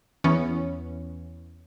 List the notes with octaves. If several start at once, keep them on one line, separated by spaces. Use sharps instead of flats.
E2 E3 B3 C#4